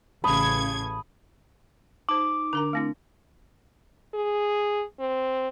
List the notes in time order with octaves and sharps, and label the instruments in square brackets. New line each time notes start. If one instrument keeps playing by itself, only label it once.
[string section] A1 C#3 G#6 [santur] A5 B5 D#6
[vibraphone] D#4 [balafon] C5 A5 [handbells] D6
[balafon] D3 A#4 A#5 [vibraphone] D4
[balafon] A3 C4 E4
[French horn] G#4
C4